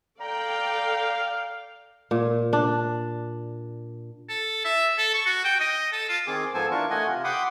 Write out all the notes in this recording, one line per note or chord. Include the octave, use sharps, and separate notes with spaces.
A4 D5 F5 G5 A#5
A#2
D4
A4
E5
A4
C#6
F#4
G5
D#5
A4
F4
D#3 C4 G#4 D6
G#2 F3 B3 A4 C5 G#5
E3 D4 F4 A#4 C#6
A3 D#5 F#5 G#5
C3 F4
F#5 G5 B5 C6 D6 D#6